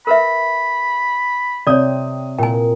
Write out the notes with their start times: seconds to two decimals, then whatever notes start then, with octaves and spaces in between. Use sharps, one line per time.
0.07 A#4 B4 E5 B5
1.67 C3 C4 C#5 D5 D#6
2.39 A#2 G5 G#5